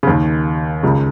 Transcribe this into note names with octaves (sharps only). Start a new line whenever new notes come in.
C#3
D#2 D#3
C#2 C#3